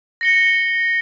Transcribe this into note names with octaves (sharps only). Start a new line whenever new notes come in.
A#6 C#7 G7